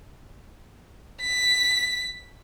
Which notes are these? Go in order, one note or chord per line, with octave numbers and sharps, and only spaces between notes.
B6